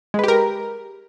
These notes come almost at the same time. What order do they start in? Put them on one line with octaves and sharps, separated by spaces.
G#3 B4 G4 A#4